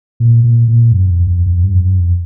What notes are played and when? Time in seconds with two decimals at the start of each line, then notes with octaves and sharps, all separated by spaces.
0.20 A#2
0.44 A#2
0.68 A#2
0.92 F#2
1.10 F2
1.27 F2
1.46 F2
1.64 G2
1.74 F2
1.82 F#2
2.00 F2